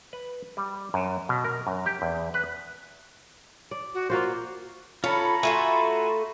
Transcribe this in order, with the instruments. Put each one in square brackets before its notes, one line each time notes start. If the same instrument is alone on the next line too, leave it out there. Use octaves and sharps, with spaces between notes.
[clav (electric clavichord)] B4
G3
F#2
B2
A#4
F#2
G4
E2
B4
[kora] D5
[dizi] F#4
[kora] A#3 F#4 C5 [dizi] F4
[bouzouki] C#4 [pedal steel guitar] F4 A4 [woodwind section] A#5 B5
[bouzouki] A3 F4 A4 [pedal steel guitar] F#4 G#5